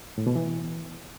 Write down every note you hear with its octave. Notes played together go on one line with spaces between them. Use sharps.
A2
B2
E3